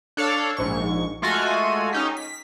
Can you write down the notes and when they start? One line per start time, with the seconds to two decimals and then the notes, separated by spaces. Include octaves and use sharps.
0.17 D4 A4 C#5 F5
0.57 A#1 G#2 C#6
1.22 G#3 A3 F4 F#4 A4 G#5
1.93 C#4 D#4 G4
2.17 B6